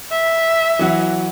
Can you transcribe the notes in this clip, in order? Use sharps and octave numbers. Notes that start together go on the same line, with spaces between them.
E5
E3 F#3 F#4